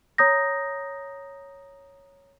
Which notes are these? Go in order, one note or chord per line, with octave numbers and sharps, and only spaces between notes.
C#5 A#5 D#6 G6 A#6